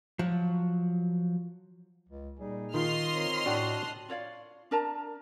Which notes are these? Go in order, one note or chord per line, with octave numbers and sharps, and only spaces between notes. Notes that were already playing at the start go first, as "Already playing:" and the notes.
F3 F#3
C#2
A#2 G3 D#4 G#4
D#3 F4 D#5 C6 F6
C4 A#4 C#5
A2 D4 F#4 G5 A5 F#6
F4 C#5 D5 F5
D4 A#4 A5 A#5